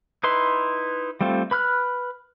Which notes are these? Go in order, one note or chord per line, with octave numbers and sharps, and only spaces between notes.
D#4 E4 B4 C6
G3 A3 C4 F4
B4 B5 F6 F#6